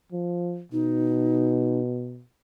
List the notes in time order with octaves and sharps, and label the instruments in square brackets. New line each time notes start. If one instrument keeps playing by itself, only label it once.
[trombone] F3
[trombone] B2 [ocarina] D#4